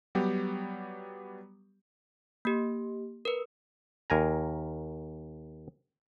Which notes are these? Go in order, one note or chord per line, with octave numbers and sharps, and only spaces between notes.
F#3 G3 B3 G4
A#3 G4
A#4 B4
D#2 A#4 G#5 A#5